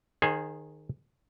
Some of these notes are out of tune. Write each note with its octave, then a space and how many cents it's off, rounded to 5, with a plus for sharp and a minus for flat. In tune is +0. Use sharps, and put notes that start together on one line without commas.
D#3 -15 G#4 +0 C5 +30